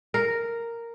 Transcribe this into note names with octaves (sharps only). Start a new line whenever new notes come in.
A#4